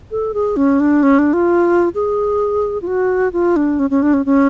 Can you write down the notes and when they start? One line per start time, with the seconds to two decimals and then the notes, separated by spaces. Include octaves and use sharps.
0.11 A4
0.34 G#4
0.57 C#4
0.80 D4
1.03 C#4
1.19 D4
1.33 F4
1.95 G#4
2.82 F4
2.87 F#4
3.33 F4
3.56 D4
3.79 C#4
3.90 C#4
4.02 D4
4.14 C#4
4.26 C#4